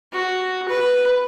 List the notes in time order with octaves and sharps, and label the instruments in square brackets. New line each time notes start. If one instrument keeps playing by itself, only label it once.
[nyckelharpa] F#4
B4